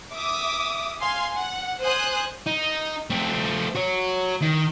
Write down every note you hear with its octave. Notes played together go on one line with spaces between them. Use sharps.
E5 D6 D#6
F5 G#5 C6
F#5
C5 G#5 D#6 F#6
D#4
A3 C4
F#4 C#5
D#3